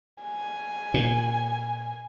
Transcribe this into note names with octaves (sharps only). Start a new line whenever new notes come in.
G#5
A#2